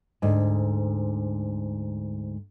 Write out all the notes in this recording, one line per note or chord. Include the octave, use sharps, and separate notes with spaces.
D2 G#2